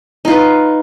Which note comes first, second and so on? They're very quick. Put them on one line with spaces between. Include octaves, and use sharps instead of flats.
D#4 F4 B4